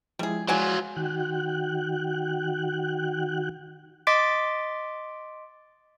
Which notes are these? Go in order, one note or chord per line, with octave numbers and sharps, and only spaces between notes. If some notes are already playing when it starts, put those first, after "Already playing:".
F3 G3 G#3 E4 G#4
F#3 F4 D5 F#5 G#5
D#3 F#4 G5 F#6
D#5 C6 D6 A6 B6 D7